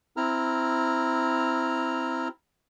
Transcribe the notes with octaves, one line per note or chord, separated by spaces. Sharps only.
C4 E4 A#5 F6